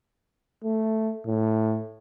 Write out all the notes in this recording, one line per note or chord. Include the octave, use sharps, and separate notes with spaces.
A3
A2